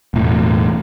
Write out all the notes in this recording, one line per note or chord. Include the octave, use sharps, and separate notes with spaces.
E1 A2